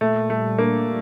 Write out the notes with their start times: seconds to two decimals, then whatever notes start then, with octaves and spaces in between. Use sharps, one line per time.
0.01 A#2 A3
0.30 G3 A3
0.59 A#3 D4